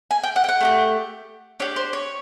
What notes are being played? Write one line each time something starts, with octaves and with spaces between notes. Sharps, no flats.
G#5
G5
F#5
G5
F#5
A3 D4 G4
D4 G4 C#5
C5
C#5